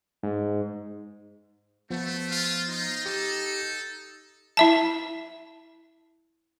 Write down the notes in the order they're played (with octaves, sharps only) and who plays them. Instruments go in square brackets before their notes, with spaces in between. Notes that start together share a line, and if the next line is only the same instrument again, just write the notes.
[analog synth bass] G#2
[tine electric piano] F3 B3 [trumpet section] A3
[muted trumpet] F4
[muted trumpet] D#4 [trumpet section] F4
[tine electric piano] G4 [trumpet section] A4
[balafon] E4 E5 A5